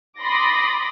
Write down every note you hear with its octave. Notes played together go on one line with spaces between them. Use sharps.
B5 C6 D6 D#6 A6 A#6